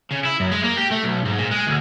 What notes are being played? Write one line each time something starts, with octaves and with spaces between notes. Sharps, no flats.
C#3
E4
F#2
G#3
A#3
G4
A3
B1
G#2
A#2
G#3
D2